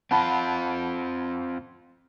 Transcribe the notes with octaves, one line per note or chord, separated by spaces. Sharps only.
C4 F4 F#5 A5 B5